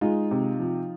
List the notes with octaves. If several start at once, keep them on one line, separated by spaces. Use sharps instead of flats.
G#3 D#4 F4
C3
F3